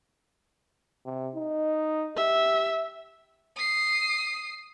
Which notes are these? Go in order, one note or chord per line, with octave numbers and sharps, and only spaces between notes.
C3
D#4
G4 E5
D#6 C7